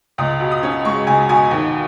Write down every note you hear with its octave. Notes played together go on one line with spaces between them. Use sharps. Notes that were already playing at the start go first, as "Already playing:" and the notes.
C#2 D#6
B2
D#6
C#4
G#3 C#6
C#2 G#5
B2 G#5
D#2